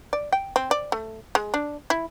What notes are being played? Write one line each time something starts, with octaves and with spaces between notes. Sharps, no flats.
D5
G5
C4
D5
A3
G#3
D4
E4